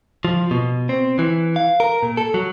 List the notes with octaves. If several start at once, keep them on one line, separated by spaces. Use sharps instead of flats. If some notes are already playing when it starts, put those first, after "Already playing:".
F3
B2
C4
E3
F5
A#4
A#2
A4
F#3